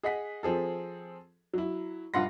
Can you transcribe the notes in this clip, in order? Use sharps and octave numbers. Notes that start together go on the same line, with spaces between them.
G#4 D#5 F#5 B6
F3 C4 G#4 A4
F#3 E4
A#1 G2 F4 F#5 C6 A#6